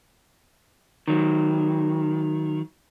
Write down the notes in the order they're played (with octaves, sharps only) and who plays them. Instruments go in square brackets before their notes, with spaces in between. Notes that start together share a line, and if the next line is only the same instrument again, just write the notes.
[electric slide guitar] D#3 F#3